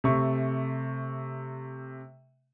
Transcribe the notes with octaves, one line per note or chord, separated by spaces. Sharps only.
C3 A3 C#6